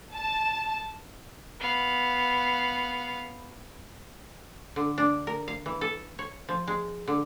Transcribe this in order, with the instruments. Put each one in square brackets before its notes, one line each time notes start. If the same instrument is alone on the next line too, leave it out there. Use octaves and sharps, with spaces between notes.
[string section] A5
[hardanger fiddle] B3 F5
[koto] D3
D4
A#4
F5
E3
A4
C#5
F3
G#3
D3